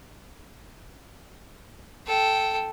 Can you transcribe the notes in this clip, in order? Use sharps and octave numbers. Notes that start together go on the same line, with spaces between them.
A4 G5